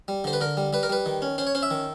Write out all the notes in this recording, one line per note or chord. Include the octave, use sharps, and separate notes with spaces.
G3
D3 C5
B4
D3 A#4
G3
G3 B4
A#4
G3 B4
D#3
C#4
C#4 C5
C#5
C#4 C5
E5
D#3